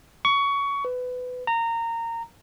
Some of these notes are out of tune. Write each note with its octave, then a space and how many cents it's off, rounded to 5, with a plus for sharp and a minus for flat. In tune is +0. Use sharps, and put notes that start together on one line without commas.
C#6 +20
B4 +20
A#5 -20